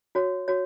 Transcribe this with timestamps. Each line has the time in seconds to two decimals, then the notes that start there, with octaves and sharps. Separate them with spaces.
0.15 F#4 C#5
0.48 F#4 C#5